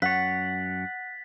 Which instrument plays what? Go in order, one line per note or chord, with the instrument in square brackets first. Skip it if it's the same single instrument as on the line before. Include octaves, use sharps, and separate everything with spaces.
[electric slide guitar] F#2 C#5 [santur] F#5 [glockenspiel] A6 B6